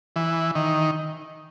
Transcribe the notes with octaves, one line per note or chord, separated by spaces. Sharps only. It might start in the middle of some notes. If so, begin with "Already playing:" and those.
E3
D#3